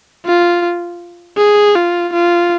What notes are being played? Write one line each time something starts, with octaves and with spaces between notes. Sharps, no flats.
F4
G#4
F4
F4